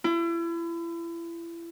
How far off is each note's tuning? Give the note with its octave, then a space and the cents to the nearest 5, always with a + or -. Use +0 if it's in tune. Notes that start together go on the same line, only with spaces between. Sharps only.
E4 +35